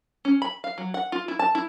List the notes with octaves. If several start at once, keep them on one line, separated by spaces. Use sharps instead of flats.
C#4
B5
F5
F#3
F#5
F4
E4
A5
E4